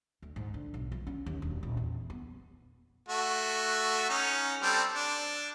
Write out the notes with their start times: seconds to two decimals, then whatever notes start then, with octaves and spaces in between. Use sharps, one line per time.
0.22 D2
0.36 G#2
0.54 D3
0.74 B1
0.92 F3
1.07 C#4
1.26 D#2
1.42 E1
1.63 D#1
1.77 E2
2.10 B3
3.09 A3 F#4
4.09 C#4 D#4
4.63 G3 C4 A4
4.94 D4